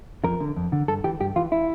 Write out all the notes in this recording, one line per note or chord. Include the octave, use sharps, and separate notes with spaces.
F2 A#4
D3
F2
D3
G2 A4
E3 G4
G2 G4
E3 F4
E4